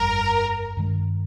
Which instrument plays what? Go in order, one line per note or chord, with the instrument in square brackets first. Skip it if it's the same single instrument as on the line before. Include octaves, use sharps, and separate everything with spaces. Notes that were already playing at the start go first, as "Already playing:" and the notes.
Already playing: [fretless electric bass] G1 F2 G3 [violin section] A#4
[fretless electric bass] G2 D#3 G#3